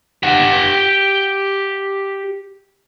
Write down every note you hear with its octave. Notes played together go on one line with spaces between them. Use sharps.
G4 F#5